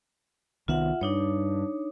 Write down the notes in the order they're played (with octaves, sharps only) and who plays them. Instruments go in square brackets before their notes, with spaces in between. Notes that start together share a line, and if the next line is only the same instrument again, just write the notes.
[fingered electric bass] C2 D#3 B3 [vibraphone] F4 E5 F#5
[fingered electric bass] G2 [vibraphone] D4 D#4 C#5